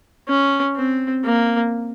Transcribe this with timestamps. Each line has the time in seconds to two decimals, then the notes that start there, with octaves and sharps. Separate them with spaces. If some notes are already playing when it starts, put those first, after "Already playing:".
0.28 C#4
0.76 C4
1.24 A#3